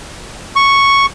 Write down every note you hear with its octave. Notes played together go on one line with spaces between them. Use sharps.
C#6